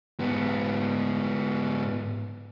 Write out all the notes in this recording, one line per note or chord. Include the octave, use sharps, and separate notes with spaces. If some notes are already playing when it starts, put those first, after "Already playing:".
G#2 B3